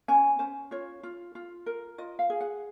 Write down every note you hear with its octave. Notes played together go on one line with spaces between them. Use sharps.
C#4 G#5
C#4 C5
F4 C#5
F4
F4
A#4
F4 D#5
F5
G#4
F#5